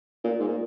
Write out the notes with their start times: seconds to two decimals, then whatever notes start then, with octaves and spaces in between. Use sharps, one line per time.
0.24 A#2
0.39 G#2
0.48 A#2